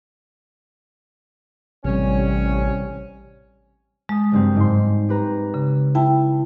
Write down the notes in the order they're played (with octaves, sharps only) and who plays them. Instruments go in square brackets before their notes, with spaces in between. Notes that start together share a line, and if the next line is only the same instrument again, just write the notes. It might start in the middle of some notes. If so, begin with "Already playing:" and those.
[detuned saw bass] A1 [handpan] C3 G3 [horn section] C#4
[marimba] G#3 [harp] A5 D#6
[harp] F#1 G2 C4
G#2 C6
G4 B4 A#5
[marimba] C#3
[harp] E4 [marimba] E5 G5 A5